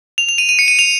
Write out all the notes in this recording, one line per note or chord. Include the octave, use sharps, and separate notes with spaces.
F7
F7
D#7
D#7
C#7
D#7
F7